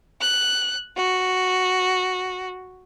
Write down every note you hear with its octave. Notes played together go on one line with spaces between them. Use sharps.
F#6
F#4